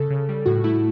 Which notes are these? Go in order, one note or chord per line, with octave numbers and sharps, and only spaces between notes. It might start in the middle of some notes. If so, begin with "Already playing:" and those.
Already playing: C#3 A4
C#3
G3
A2 F#4
A3 E4